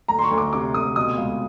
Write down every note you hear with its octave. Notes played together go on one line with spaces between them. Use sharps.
D2 A#5
C6
C#6
D2
D6
C3 D6
D2 D#6
B2 D#6
C#2